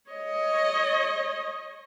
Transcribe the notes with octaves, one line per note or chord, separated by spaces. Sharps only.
C#5 D#5